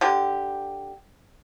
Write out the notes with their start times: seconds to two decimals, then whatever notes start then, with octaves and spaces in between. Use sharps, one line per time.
0.01 D3 G4